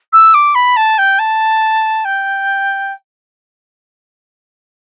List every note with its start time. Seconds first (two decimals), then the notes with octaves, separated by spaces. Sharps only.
0.13 E6
0.34 D6
0.55 B5
0.76 A5
0.98 G5
1.19 A5
2.05 G5